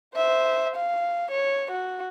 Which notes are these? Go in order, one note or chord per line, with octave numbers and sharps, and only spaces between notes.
C5 E5
F5
C#5
F#4